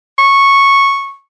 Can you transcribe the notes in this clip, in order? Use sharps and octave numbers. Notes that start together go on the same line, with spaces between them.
C#6